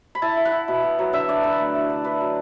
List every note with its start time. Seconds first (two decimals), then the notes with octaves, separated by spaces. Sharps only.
0.15 B5
0.22 E4 A5
0.37 E4
0.45 F#5
0.52 E4
0.68 B2
0.83 B2
0.99 F#3
1.13 D3 E5
1.29 D4 D5
1.43 D3 B4
1.59 A3
1.75 E4
1.90 D3
2.04 D4 B4
2.20 F#3